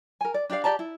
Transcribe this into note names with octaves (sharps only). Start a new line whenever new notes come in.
A#4 G#5
D5
D4 G4 D5 F5
G4 D5 A5 A#5
E4